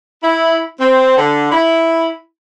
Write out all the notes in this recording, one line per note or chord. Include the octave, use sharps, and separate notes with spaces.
E4
C4
D3
E4